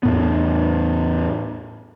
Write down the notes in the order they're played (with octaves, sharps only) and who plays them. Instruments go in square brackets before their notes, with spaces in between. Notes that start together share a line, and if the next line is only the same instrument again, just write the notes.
[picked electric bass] E2 A2 B3